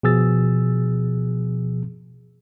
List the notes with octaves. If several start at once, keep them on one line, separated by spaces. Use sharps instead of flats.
B2 F3 G#4 E6 A6